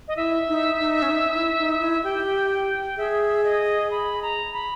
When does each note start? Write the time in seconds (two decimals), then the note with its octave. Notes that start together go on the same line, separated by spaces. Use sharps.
0.08 D#5
0.16 E4 E5
0.48 D#4
0.79 D#4
1.02 C#4
1.10 D#4
1.34 E4
1.58 D#4
1.80 E4
2.03 G4 G5
2.51 G5
2.97 G#4 E5
3.44 D#5
3.91 B5
4.22 A#5
4.53 B5